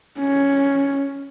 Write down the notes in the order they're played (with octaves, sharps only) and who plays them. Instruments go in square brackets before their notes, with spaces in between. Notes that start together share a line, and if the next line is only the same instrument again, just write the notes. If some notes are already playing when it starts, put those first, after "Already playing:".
[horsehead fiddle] C#4